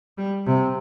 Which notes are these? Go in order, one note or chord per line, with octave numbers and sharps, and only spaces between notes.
G3
C3